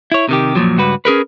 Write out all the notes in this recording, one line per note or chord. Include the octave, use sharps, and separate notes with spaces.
E4 C#5
C3 D#3 G4
F#2 A#2 D#3 F3 F#3
C#2 G2 F#4 B4
C#4 G#4 A#4 B4